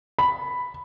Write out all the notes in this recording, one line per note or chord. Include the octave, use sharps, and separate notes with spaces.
B5